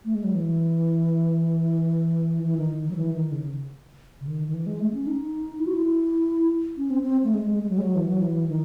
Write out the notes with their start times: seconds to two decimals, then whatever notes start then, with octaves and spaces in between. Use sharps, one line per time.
0.05 A3
0.15 G#3
0.24 F#3
0.34 E3
2.43 E3
2.57 D#3
2.83 D#3
2.91 F#3
2.96 E3
3.14 D#3
3.32 C#3
4.21 C#3
4.27 D#3
4.48 D#3
4.54 E3
4.67 G#3
4.80 A3
4.94 C#4
5.07 D#4
5.59 E4
5.67 F#4
5.74 E4
6.77 C#4
6.90 C4
7.03 C4
7.24 A3
7.34 G#3
7.51 G#3
7.63 G#3
7.69 F#3
7.78 G#3
7.82 F#3
7.96 E3
8.08 F#3
8.22 E3
8.48 D#3